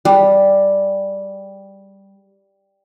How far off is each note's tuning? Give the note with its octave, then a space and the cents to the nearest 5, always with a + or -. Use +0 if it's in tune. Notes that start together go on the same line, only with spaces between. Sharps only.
G3 +0 G#4 +0